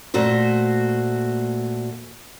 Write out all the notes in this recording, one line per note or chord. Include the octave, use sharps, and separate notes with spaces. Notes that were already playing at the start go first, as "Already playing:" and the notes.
A#2 A3 F#4 C5